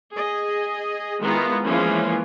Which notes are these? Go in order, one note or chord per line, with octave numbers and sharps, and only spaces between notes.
G#4 D#5
D#3 G#3 B3 E4 F4 A#5
E3 F3 G#3 A#3 C#4 F4